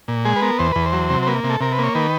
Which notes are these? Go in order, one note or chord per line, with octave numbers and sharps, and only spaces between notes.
A#2
G#3 G#4
B4
B3 A#4
E2 C5
E2 B4
C5
F#3
C3
C5
A#3 B4
C3
A4
C3 A#4
B4
A#3 C#5
D#3 B4